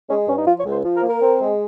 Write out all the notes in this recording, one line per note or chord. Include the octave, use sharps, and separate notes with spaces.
G#3 C#4
G2 C#4
D#4
F3 F4
C#5
C#2
C5
F3
A#4
A#3
A#4
C4
G#3